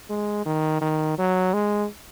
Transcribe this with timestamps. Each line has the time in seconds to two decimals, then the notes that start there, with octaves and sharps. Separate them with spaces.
0.09 G#3
0.46 D#3
0.81 D#3
1.18 F#3
1.54 G#3